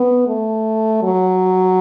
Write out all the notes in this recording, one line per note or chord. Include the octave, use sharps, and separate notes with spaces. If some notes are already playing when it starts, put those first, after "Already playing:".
Already playing: B3
A3
F#3